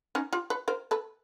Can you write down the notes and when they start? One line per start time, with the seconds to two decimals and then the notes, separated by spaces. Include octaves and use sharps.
0.15 C#4 D#4
0.33 F4 G4
0.50 B4 C#5
0.68 A#4 C5
0.91 A4 B4